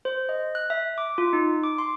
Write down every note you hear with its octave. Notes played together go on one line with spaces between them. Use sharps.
C5
D#5
F#6
E5
D6
F4
D#4
D6
C6